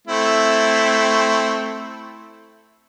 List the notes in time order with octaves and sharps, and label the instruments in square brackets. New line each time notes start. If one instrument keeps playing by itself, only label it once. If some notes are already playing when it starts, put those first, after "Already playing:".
[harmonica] A3 C4 E4